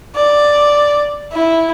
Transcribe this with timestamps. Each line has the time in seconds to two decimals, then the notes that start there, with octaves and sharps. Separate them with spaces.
0.15 D5
1.33 E4